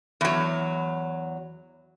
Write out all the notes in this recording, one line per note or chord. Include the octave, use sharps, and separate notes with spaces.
E2 F#3